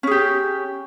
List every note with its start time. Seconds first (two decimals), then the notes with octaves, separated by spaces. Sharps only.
0.03 C#4
0.07 G#4
0.11 G4